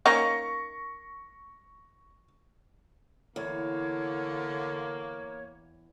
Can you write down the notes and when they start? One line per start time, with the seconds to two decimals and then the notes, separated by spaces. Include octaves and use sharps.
0.06 A#3 C#4 D#4 C#6 A#6
3.36 E2 D3 A#3 C#5